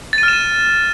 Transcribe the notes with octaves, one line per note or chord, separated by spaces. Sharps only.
A6
D#7
F6
E7
D#7